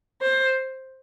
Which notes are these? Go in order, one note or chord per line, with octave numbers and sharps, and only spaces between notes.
C5